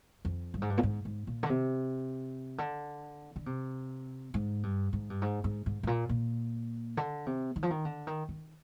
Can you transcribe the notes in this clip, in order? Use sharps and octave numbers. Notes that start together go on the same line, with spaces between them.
F2
G2
G#2
G2
A#2
G#2
G#2
A#2
D3
C3
D3
D3
C3
G#2
G2
G#2
G2
G#2
G#2
G#2
G#2
A#2
A#2
D3
C3
D#3
F3
D#3
D3
D#3
D#3